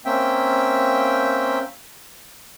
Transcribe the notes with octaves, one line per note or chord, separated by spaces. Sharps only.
A#3 C4 C#4 E5 G5